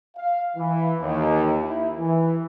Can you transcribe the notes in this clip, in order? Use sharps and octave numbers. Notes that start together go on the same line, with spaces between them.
F5
E3
D#2
E4
E3